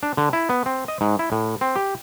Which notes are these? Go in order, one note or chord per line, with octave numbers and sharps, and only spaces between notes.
D4
D3
E4
B3
C4
D#5
G#2
E4
A2
C4
G4